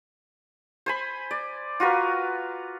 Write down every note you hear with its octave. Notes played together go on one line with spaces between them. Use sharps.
C5 G#5 B5
D5
F4 F#4 A#4 B4